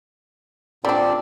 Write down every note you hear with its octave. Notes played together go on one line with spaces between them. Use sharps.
A#2 G3 C4 D4 D5